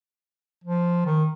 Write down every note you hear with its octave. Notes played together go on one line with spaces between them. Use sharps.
F3
D#3